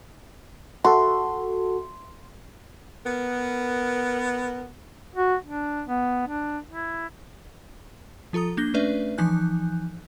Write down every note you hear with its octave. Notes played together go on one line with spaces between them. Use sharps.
F#4 A4 C6
B3 A#4
F#4
D4
B3
D4
E4
F3 F4 A4 A#5 D#6
A#3 D4 G6 A#6 G7
A3 C#4 D4 B4 D5 E5
E3 F3 D#4 G#5 F#6 G6